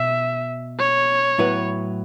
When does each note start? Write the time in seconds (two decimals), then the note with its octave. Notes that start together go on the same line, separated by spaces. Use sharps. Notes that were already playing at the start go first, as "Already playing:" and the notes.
Already playing: B2 E5
0.79 C#5
1.38 A2 F#3 B3 E4 B4